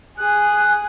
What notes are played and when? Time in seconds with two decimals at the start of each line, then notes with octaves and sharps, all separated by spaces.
0.18 G#4 F#6